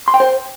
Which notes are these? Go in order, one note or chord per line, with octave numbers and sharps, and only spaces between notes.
C6
G5
C5